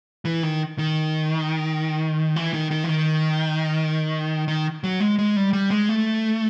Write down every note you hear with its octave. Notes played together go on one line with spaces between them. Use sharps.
E3
D#3
D#3
E3
D#3
D#3
E3
D#3
D#3
F#3
G#3
G#3
G3
G3
G#3
A3